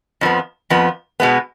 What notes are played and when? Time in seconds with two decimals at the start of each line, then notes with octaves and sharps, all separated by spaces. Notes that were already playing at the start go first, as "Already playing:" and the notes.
0.21 F2 F3 B3
0.70 F2 F3 B3
1.20 B2 G#3 B3